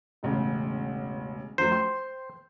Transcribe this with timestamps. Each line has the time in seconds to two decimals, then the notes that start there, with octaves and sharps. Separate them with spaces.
0.23 E1 A1 C#3
1.58 F#2 F3 A3 C5
1.72 G5 C6